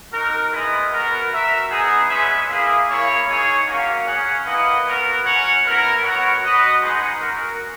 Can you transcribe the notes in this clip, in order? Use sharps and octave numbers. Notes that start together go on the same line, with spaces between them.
D#4 F#4 A#4
G#3 B3 E4 B4 D#5
B3 F#4 A#4
F#4 A#4 E5
B3 D#4 G#4
G#3 C#4 G#4 B4 E5
A#3 E4 G#4
A#3 E4 G#4 C#5
D#4 G#4 C#5
A#3 C#4 F#4
C#4 G#4 C#5 F#5
A#3 E4 B4 D#5 F#5
B3 F#4 A#4
C#4 F#4 C#5 F#5
B3 E4 A#4
B3 F#4 A#4 C#5 F#5
F#4 B4 D#5
G#3 D#4 G#4 B4 F#5
C#4 F#4 A#4